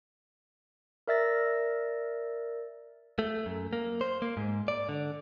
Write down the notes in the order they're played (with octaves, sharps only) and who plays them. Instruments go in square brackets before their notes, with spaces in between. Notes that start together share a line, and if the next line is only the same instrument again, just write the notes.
[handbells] A#4 D5 E5 E6 A6 A#6
[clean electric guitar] A3
F#2
A#3
C5
A#3
G#2
D5
D3